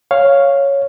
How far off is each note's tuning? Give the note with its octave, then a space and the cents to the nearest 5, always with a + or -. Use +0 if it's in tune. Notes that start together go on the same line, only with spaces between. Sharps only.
C#5 +0 F5 +0